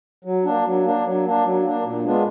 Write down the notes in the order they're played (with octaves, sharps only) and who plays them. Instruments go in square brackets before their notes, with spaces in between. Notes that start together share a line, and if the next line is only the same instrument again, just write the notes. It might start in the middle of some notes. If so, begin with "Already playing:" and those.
[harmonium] F#3
A#3 D4
F#3
A#3 D4
F#3
A#3 D4
F#3
A#3 D4
A#2
G#3 B3 D4 F4